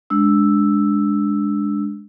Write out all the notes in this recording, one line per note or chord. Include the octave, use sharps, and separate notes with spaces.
G#3 D4 E6